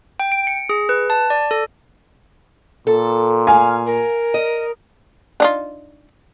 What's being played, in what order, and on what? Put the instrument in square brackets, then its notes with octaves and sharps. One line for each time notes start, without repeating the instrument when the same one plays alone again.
[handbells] G5
D7
C#7
G#4
B4
A5
D5
A4
[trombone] A#2 [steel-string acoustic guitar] A4
[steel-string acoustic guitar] F5 [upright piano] G#5 [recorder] F6
[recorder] A#4
[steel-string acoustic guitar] D#5
[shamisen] D4 D#4 F4